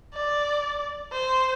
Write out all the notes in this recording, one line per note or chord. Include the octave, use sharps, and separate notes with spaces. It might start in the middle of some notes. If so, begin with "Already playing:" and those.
D5
C5